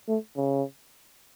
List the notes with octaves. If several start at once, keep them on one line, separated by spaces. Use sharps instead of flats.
A3
C#3